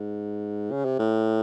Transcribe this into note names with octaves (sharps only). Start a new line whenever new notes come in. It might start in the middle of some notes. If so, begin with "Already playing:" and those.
Already playing: G#2
C#3
C3
A2